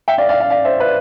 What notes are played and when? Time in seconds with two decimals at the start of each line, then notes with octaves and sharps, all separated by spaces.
0.08 E5 G5
0.18 D5 F5
0.29 D5 F5
0.40 D5 F5
0.50 D5 F5
0.65 C5 E5
0.80 B4 D5